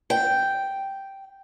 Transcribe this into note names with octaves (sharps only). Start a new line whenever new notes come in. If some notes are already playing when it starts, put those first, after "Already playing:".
G5